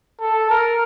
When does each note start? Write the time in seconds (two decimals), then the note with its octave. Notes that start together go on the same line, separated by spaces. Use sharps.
0.20 A4
0.50 A#4